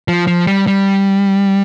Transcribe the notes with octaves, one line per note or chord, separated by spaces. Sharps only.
F3
F3
G3
G3